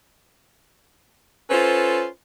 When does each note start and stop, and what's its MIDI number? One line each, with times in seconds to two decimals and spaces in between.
1.50 2.06 61
1.50 2.06 65
1.50 2.06 69
1.50 2.06 71
1.50 2.06 72